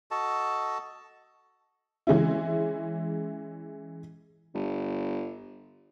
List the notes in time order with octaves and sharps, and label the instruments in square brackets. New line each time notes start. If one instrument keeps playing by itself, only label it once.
[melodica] F#4 A4 D#5 A5
[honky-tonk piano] E3 G#3 C#4 E4
[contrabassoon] G1